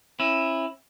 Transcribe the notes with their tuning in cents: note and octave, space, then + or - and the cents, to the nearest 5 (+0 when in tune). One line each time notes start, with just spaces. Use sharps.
C#4 -40 E4 +0